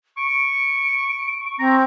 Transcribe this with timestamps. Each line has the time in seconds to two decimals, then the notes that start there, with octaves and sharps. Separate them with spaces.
0.17 C#6 D7
1.40 C#6
1.59 C4 A#5